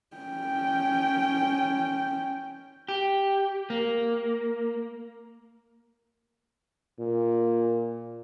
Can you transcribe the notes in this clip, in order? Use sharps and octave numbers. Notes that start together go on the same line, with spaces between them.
C#4 G5
G4
A#3
A#2